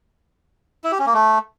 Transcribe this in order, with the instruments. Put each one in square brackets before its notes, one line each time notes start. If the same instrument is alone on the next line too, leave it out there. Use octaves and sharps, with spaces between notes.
[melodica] E4
G4
C#4
A#3
A3